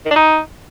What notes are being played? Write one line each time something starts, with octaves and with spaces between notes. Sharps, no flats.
D#3
D4
D#4